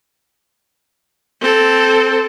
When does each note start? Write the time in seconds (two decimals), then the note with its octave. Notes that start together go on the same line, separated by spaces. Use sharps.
1.41 C4 A4